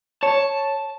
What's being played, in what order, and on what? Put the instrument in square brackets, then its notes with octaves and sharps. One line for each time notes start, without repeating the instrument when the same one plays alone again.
[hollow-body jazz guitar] C#5 [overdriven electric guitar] A5